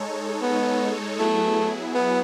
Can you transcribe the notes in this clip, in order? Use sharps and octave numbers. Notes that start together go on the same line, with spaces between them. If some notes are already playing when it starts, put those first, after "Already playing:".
Already playing: G#3 D#4 A4 C#5
B3
F#3 A3 B3 E4 G#4
B3